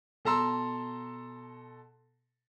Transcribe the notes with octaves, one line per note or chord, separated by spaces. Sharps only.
B2 A4 A5 A#5 C6 E6